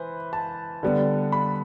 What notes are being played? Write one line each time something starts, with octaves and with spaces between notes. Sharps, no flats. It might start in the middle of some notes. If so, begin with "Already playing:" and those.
Already playing: E3 B4 C5
A5
D3 G3 B3
B5